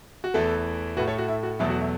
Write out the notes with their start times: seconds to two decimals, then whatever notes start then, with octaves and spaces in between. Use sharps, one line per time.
0.24 F#4
0.34 E2 E3 A3 E4 A4
0.97 A2 A3 F#4 B4
1.07 A4 C#5
1.18 F#4
1.28 E4
1.43 F#4
1.59 E2 B2 F#3 A3 E4 A4
1.70 F#4
1.81 E4